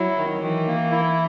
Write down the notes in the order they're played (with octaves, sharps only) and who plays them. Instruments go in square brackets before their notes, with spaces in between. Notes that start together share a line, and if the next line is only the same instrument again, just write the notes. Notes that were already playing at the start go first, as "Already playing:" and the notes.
Already playing: [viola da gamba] F#3 [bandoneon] E4
[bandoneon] D#3
[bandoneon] D#3 [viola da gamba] E3
[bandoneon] A#3
E4